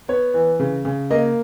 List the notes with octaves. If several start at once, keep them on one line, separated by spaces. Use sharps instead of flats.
B3 C#5
E3
C#3
C#3
A#3 D#5